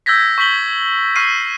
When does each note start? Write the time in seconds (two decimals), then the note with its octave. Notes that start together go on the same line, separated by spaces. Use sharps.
0.06 E6 G6 G#6 A#6 B6
0.38 C#6 G6 B6 F#7 G7
1.16 C#6 F6 C7 D#7